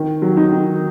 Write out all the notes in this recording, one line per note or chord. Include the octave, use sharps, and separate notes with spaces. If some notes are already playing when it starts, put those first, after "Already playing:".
Already playing: D#3
F#3
D#4
D#3